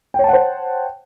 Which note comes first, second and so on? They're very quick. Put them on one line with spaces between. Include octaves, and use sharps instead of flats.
G5 C#5 A5 F#5 C5